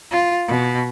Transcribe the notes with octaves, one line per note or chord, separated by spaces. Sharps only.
F4
B2